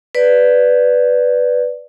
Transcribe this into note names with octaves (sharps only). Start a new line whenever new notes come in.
B4 D5